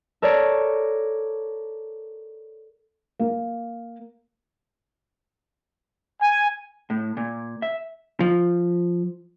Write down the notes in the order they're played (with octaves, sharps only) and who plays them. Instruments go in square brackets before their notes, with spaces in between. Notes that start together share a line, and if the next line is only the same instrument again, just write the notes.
[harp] A4 A#4 C#5 D5
[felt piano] A#3
[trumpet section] G#5
[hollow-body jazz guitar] A2
A#2
E5
F3